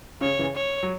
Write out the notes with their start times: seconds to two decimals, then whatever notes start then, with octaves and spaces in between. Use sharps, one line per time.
0.21 C#3 C#5
0.39 C#3 E3
0.56 C#5
0.83 F#3